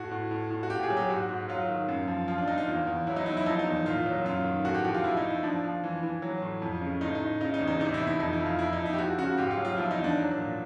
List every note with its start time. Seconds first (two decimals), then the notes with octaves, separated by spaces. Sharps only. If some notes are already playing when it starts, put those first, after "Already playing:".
Already playing: A2 F#4
0.11 A2
0.31 A2
0.50 A2
0.63 F#4
0.70 A#2 G4
0.83 G#4
0.90 F#3
0.97 G4
1.10 G#2 F#4
1.29 G#2
1.48 F#3 F4
1.68 D#3
1.89 F#2
2.08 F3
2.28 F3 F4
2.38 D4
2.48 F3 D#4
2.58 F4
2.68 E2
2.87 E2
3.07 F#3 E4
3.16 D#4
3.26 F#3 E4
3.37 E4
3.46 F3 D#4
3.59 D#4
3.65 E2
3.86 A#2 F4
4.06 F#3
4.25 F#2 F4
4.44 D#3
4.64 A2 F#4
4.74 G4
4.84 F3 F#4
4.94 F4
5.04 F3 E4
5.17 D#4
5.24 F3
5.30 E4
5.43 F3 D4
5.64 F3
5.84 E3
6.03 E3
6.22 F#3
6.42 A2
6.62 F2
6.81 C#3
7.01 A2 D#4
7.15 D#4
7.21 A2
7.40 C#3 D#4
7.54 D#4
7.60 E2
7.68 D#4
7.80 C3 D#4
7.94 E4
8.00 E2
8.07 E4
8.19 F2 D#4
8.33 E4
8.40 F2
8.46 F4
8.59 F2 E4
8.73 D#4
8.79 F2
8.86 E4
8.93 G4
8.98 F3 F#4
9.18 C#3 F#4
9.38 G#2 G4
9.51 F4
9.57 F#3
9.65 F4
9.77 F3 E4
9.91 D#4
9.97 E2
10.04 D4
10.17 F#3
10.37 A#2